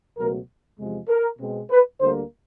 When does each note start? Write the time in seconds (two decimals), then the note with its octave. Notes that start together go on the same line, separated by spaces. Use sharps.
0.16 C#2 B2 F#3 A3 A#4
0.78 E2 C3 F3 G#3
1.08 A#4
1.39 B2 G#3 C4
1.70 B4
2.00 D2 D3 G3 A#3 C5